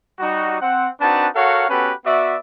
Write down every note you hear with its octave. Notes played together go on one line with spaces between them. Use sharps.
G3 D#4 F#4
C4 F#5
C4 D4 D#4 F#4 B4 A5
F#4 A4 A#4 C#5 F5 F#5
B3 C#4 F#4 G4 A4 B4
B3 F#4 D5 E5